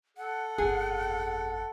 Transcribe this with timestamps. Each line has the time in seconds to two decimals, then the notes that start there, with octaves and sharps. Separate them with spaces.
0.17 A4 F#5
0.58 G1 F2 G#4